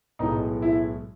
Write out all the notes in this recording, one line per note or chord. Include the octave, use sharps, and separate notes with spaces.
B1 A2 G#3 B3 D#4
E4